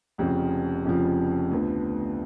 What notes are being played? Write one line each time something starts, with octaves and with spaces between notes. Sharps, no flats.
F1 F2 C#3 F3
F1 F2 C#3 F3
D2 D3 F3 B3